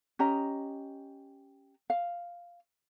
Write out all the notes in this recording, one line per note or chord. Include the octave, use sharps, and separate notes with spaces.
C#4 G4 D#5 A#5
F5